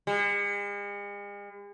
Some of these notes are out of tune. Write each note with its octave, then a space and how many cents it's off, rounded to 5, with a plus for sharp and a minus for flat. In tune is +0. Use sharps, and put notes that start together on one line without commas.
G#3 -45